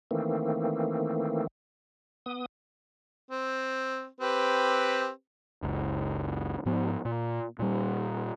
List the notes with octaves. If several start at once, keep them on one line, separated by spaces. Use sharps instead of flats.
D#3 E3 A3 A#3 C4
B3 D#6
C4
C4 G4 B4
F#1 C#2
G#2 F3 B3
A#2
A#2 G3